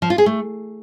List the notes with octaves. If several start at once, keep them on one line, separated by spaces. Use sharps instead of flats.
F3
F4
G#4
A3